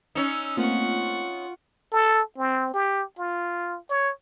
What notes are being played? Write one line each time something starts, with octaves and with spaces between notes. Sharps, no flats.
C#4 D#4 E6
A3 A#3 C4 F4 F#5 C#6
A4
C4
G4
F4
C#5